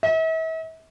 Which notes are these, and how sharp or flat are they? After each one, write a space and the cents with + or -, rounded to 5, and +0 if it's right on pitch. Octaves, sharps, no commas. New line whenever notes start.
E5 -40